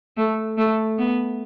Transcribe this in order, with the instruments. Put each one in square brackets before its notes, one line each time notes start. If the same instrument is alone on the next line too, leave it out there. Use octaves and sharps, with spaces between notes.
[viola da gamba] A3
A3
B3